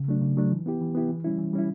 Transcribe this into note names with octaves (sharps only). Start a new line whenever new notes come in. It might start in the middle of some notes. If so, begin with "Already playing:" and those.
Already playing: C#3
F#3 A3 D4
C#3
F#3 A3 D4
E3
B3 E4 G4
E3
B3 E4 G4
E3
G3 C#4 E4
E3
G3 C#4 E4